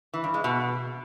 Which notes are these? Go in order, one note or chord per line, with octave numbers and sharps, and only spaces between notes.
E3
G2
G#3
B2